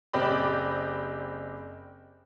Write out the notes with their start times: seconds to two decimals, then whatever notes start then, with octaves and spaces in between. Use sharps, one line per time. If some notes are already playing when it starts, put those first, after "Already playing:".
0.13 F#1 C4 G4 D5 D#5 B5